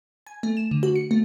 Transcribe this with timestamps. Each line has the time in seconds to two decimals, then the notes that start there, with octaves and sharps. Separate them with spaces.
0.26 G#5
0.43 A3
0.57 E7
0.71 D3
0.83 F#4
0.96 C#7
1.11 A3